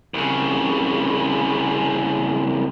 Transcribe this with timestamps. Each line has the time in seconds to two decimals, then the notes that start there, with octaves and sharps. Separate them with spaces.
0.14 C2 C#3